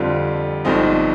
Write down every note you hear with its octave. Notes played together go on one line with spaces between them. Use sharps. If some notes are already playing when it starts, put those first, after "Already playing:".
Already playing: F2 D3 G3 C4 F4
G1 G2 F3 C4 D#4